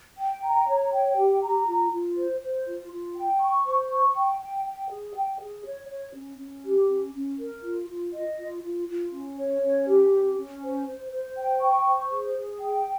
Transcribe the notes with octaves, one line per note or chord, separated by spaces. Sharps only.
G5
A#5
C#5
G5
G4
A#5
F4
F4
C5
C5
F4
F4
G5
C#6
C5
C#6
G5
G5
G5
G#4
G5
G#4
C#5
C#5
C#4
C#4
G4
C#4
C#4
A#4
F4
F4
D#5
F4
F4
F4
C#4
C#5
C#4
G4
C#4
C#4
C5
C5
C5
G5
C#6
C5
G#4
G#4
G5